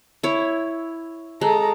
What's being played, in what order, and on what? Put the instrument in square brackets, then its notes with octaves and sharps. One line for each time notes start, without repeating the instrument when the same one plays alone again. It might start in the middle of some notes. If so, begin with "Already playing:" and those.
[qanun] E4 C#5
[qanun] G#3 [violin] A4 A#5